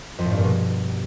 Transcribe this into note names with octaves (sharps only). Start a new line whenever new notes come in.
F2
A2
G2
A#2
B2